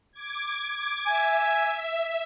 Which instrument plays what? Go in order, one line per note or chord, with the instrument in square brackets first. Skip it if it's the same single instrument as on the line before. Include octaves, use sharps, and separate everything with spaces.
[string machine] D6 G#6
[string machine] E5 [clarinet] G#5